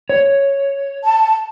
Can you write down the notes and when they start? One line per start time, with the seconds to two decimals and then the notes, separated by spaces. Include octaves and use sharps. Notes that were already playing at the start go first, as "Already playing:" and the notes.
0.09 C#5
1.05 A5